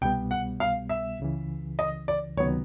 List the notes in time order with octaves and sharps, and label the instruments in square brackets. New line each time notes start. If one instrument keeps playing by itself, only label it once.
[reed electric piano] C2 B2 G3 B3 [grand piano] G5
[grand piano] F#5
F5
E5
[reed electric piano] C#2 C#3 E3
[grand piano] D#5
D5
[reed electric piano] C#2 C3 D#3 F#3 B3 [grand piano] C#5